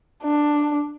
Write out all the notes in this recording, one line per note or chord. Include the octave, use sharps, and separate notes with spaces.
D4